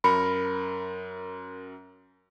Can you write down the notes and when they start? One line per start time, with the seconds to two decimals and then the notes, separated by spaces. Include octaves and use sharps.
0.04 F#2 A#4 B5 C#7